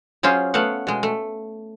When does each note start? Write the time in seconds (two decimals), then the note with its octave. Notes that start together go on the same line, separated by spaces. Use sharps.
0.23 F#3 C#4 F4 G#4 C5
0.54 A3 B3 F5 F#5
0.87 B2 G#3
1.03 A3